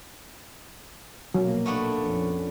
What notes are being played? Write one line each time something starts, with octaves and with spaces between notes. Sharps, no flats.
A#1 B2 F#3 A#3
A3 B3 D4
A#1 F2 C#4